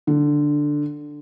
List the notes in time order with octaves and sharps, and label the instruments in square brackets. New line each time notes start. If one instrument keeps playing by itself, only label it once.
[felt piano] D3